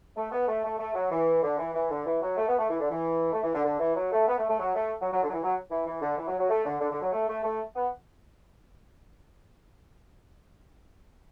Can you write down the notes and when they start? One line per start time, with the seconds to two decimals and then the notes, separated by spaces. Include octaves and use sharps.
0.16 A3
0.31 B3
0.47 A3
0.63 A3
0.79 A3
0.95 F#3
1.11 E3
1.42 D3
1.58 E3
1.74 E3
1.90 D3
2.05 E3
2.22 F#3
2.37 A3
2.48 B3
2.58 A3
2.69 E3
2.79 D3
2.90 E3
3.32 A3
3.43 E3
3.53 D3
3.64 D3
3.80 E3
3.95 F#3
4.12 A3
4.27 B3
4.38 A3
4.48 A3
4.59 F#3
4.75 A3
5.01 F#3
5.12 F#3
5.22 D3
5.28 F#3
5.33 E3
5.43 F#3
5.70 E3
5.85 E3
6.01 D3
6.17 E3
6.28 F#3
6.38 F#3
6.49 A3
6.65 D3
6.80 D3
6.91 D3
7.02 F#3
7.12 A3
7.28 A3
7.43 A3
7.75 B3